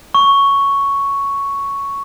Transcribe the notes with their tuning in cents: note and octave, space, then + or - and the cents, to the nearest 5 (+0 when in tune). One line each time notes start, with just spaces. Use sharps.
C#6 +5